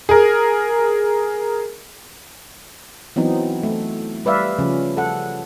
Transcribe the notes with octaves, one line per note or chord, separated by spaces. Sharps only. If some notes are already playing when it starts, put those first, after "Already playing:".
G#4 A#4
E3 F#3 B3 C4 D#4
A3
G3 B4 D5 E5 F5
C#3 F3 C#4
A4 F#5